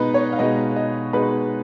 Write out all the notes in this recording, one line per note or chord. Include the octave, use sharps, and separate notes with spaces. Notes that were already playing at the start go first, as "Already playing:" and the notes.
Already playing: B2 G#3 B3 D#4 B4 D#5
C#5
F5
B2 G#3 B3 D#4 D#5
D#5
B2 G#3 B3 D#4 B4